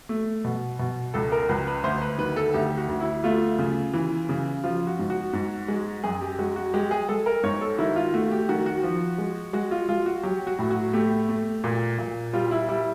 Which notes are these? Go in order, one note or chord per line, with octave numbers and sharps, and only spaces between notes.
A3
B2
B2
C#2 A4
A#4
C#2 B4
B4
D2 C5
B4
D#3 B4
A4
D2 G4
F#4
D2
E4
A3 F4
C#3
E3
C#3
F3 F4
F#4
G#2
F#4
G#2
G#3
F#2 G#4
G4
G#3 F#4
F#4
G#3 G4
G#4
G#3 A4
A#4
G#2 C#5
A4
D#3 E4
F4
A3 F#4
G4
D#3 F#4
F#4
F3
G#3
G#3 F#4
F4
G#3 F4
F#4
F#3 G4
F#4
A2
F#4
A3 G4
A3
A#2
A#2
G3 F4
E4
G3 E4